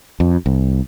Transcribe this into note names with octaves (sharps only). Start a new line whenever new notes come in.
F2
C2